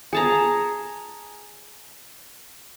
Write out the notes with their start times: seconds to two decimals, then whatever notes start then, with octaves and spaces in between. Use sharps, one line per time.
0.13 G#4 A5 A#5